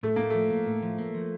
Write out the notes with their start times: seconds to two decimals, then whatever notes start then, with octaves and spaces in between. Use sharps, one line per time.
0.03 A2 A3
0.16 A2 A#3
0.30 F3 A3
0.50 A#3
0.66 A2
0.82 F3
0.98 A#3
1.15 F3